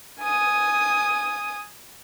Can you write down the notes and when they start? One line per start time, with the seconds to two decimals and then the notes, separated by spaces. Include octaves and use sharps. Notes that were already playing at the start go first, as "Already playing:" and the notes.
0.20 G#5 D#6